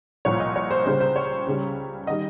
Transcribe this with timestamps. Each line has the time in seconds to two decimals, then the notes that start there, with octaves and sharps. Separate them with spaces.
0.25 C2 A#2 F3 C#5
0.40 D#5
0.56 C#5
0.71 C5
0.85 C#2 C#3 G3 C5
1.00 C5
1.16 C#5
1.47 C#2 C#3 G3
2.07 D#3 G3 D#5